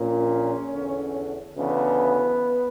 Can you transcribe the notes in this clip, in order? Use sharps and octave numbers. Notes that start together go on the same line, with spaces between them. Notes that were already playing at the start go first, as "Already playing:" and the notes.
Already playing: A#1 A#2 C#4
E2 D3
D2 C#3 E3 B3